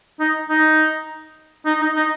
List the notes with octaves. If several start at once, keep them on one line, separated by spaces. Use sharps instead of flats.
D#4
D#4
D#4
D#4
D#4